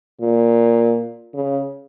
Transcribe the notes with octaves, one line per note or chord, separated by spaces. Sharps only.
A#2
C#3